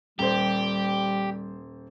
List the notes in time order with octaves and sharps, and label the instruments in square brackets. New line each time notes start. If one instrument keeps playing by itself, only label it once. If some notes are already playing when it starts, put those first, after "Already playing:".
[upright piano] D#1 C5 [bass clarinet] G3 [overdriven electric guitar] G4